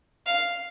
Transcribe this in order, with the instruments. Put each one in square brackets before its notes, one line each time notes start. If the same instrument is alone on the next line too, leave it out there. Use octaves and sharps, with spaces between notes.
[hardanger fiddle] F5